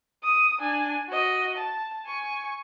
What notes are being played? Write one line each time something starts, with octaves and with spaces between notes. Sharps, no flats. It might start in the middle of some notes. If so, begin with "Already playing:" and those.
D#6
D4 G#5
F#4 D#5
A5
G#5 C#6